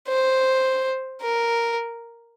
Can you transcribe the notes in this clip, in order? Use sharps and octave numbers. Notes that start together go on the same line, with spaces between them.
C5
A#4